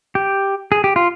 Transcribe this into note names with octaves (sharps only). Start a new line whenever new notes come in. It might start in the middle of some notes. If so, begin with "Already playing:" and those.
G4
G#4
G4
F4